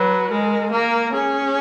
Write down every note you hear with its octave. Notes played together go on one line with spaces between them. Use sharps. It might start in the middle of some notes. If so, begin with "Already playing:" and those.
Already playing: F#3 B4
G#3 A#4
A#3 A#4
C#4 G#4